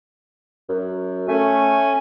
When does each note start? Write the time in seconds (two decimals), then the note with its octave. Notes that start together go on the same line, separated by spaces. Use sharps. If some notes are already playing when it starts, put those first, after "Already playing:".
0.69 F#2
1.28 A3 C#4 G#5